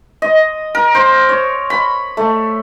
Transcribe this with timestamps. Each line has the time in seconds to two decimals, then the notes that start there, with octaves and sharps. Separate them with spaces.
0.22 D#5
0.75 A#4
0.95 C5
1.29 C#5
1.70 B5
2.17 A3